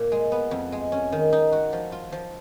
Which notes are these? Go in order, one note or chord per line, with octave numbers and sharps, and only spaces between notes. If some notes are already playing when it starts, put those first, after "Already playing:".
Already playing: A#2
G#3
B3
F2
G#3
C#4
D#3
D#4
F#4
F3
F4
F3